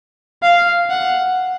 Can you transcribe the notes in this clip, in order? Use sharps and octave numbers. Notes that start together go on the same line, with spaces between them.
F5
F#5